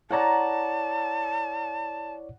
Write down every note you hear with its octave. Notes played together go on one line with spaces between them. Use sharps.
E4 C#5 D5 F#5 A5 A#5